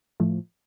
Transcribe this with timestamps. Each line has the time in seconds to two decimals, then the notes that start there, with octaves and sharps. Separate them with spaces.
0.20 A2 F3 A3